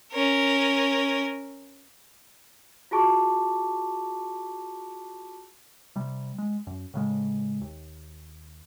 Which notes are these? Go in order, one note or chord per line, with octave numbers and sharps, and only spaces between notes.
C#4 A#4
F4 F#4 G#4 A5 C#6 D6
C3 G3
G#3
F#2
A2 C#3 G#3
D#2